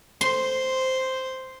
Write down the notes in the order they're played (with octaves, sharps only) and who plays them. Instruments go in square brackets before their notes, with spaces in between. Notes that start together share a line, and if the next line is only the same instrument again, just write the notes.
[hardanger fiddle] C5 [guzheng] C6